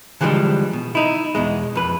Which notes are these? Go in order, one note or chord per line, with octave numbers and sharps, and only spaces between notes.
D3 E3 F3 G3 G#3 D4
B2
D#4 E4
E2 B2 G#3
F2 B4